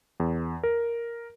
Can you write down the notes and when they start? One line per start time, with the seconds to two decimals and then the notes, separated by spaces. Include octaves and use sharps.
0.20 E2
0.63 A#4